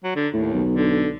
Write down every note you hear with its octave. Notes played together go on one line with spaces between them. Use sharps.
F#3
D3
D#2 A2
B1
D3